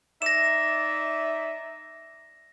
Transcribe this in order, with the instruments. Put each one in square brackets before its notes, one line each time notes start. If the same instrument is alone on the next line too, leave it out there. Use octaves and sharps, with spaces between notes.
[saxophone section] D#4 D5 E5 [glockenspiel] A#6 E7